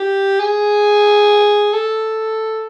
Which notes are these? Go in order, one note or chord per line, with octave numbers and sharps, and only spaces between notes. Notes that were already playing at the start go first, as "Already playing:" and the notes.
Already playing: G4
G#4
A4